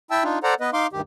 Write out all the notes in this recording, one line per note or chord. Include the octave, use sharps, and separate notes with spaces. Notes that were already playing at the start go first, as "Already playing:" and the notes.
E4 E5 G5 A5 E6
D4 D#4 F4
A4 C5 D5 F#5 A#5
B3 B4 D#5
D#4 F5 C6 D6
D2 G2 D#3 G4